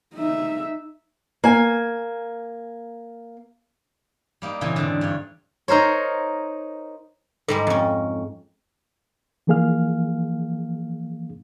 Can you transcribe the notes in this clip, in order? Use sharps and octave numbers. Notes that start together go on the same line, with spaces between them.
D#4 E5
A#3 G#5
G3 A#3 D#4
A#2 C#3 E3 C4 G5 G#5
E2 G#2 D3
G2 C#5
D#4 A#4 C5 C#5
G#2 G3 G#3 A4
F2 C#4
E3 F3 A#3 G#4 F5 F6